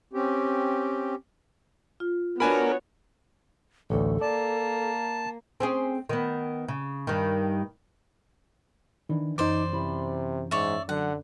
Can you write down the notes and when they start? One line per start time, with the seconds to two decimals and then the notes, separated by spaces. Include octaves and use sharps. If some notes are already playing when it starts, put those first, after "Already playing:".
0.13 C4 C#4 G4
2.00 F4
2.40 B3 D4 F#4 A#4 C#5 G#5 B5
3.90 A1 D2 A4
4.21 A#3 D5 A5
5.60 C4 C#4 G#4
6.09 D#3 B3
6.68 C#3
7.07 G2 D#3
9.09 D#3 E3 D4
9.38 F#2 D#4 C5 D5 D6
9.73 C3 E3 B5
10.51 G#2 C#5 D5 E5
10.89 D3 F#3 F#5